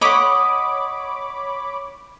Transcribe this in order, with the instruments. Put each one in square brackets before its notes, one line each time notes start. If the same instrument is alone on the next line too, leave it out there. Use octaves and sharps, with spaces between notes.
[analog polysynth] C#5 B5 D6 [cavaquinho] D#5 F#5